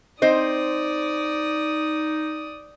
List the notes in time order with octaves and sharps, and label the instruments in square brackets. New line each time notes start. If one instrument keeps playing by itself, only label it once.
[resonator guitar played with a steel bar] C4 C5 D#5 [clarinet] D#4 [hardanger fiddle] D5 D#6